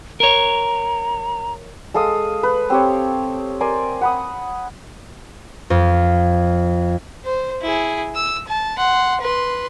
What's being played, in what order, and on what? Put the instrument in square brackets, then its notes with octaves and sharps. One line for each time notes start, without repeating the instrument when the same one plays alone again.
[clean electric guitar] A#4 C#5 [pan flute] A#5
[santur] G#3 A4 F5 D#6
B4
C4 G4 C#5
A#4 C5 D5 G#5
F#5 B5 D#6
[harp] F2
[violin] C5
E4 G#4
E6
A5
F#5 C6
B4 C6